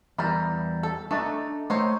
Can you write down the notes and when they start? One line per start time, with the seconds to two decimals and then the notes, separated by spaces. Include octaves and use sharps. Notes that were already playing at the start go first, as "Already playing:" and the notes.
0.18 E2 E3 G3 A#4 A#5
0.83 A4
1.11 A3 D4 D#4 A4
1.70 A3 D#4 C5 C#5